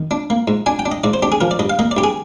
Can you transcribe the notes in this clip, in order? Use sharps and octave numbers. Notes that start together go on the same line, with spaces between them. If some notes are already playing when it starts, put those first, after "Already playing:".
Already playing: D#3
D4
A#3
G#2
D4 G#5
G5
D4
D#5
G#2 D5
C5
D4 G4
G#4
F3 A#4
D5
G2 D#5
F5
A#3 D#5
D5
G2 G4
G#4